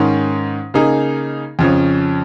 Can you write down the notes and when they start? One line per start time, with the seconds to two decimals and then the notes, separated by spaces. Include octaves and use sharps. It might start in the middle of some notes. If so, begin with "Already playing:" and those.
Already playing: G#2 D#3 C#4
0.74 C#3 A#3 D#4 G#4
1.59 F2 C#3 F3 C#4